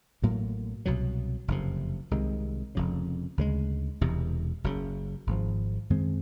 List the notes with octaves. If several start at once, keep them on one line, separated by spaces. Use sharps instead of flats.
A1 A2 F#3 A#3
C2 B2 F#3
F#1 F2 C3
C2 C3 D#3 G#3
F1 F2 C#3
D2 C#3 E3 G#3
E1 E2 C3
F#1 F#2 C#3
G#1 G#2 F3
F#2 D#3 G#3 C4